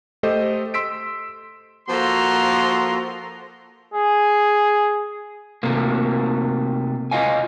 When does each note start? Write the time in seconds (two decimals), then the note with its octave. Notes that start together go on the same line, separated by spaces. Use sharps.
0.23 A3 G4 A4 C5 D#5
0.74 C6 E6 B6 D7
1.89 F3 A#3 F#4 A4 A#5 C6
3.94 G#4
5.63 C3 A3 A#3
7.11 F4 D#5 F5 G#5